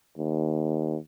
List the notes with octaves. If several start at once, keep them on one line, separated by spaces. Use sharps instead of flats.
D#2